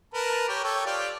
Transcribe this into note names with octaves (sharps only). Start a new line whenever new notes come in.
A#4 B4 A5
G4 A#4 C#5
A4 C#5 G5
F4 G4 D5